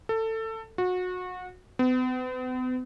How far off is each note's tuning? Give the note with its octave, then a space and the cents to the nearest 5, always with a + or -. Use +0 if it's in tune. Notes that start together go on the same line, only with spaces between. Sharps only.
A4 +20
F#4 -25
B3 +45